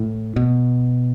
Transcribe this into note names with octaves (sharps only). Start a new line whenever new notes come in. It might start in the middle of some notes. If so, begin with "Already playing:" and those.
Already playing: A2
B2